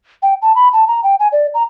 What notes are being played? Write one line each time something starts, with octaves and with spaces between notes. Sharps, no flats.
G5
A5
B5
A5
A#5
G5
G#5
D5
A#5